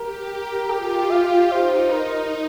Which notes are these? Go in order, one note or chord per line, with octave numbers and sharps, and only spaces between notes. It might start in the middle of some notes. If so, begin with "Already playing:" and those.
Already playing: G4 A#4
F4 G4
F5
D#4 C5
A#4